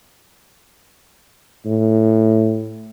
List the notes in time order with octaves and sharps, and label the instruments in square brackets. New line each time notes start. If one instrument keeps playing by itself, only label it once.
[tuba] A2